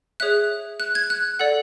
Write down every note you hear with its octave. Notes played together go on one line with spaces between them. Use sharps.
G#4 C#5 E5 F#6
F#6
G#6
F#6
A4 D5 F#5